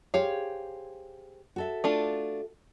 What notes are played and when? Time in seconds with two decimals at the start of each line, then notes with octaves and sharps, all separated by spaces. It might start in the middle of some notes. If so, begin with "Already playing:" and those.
0.14 G4 G#4 C5 C#5 F5
1.56 F#4 A4 E5
1.84 A3 D4 F4